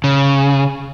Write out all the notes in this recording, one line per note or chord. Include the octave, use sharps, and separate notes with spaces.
C#3